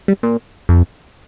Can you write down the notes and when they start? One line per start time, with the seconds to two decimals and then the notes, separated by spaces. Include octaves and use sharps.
0.08 G3
0.23 A#2
0.69 F2